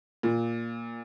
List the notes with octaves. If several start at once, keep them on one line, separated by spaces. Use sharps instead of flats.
A#2